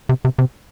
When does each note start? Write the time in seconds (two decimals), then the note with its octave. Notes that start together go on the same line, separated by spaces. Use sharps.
0.09 C3
0.25 C3
0.39 C3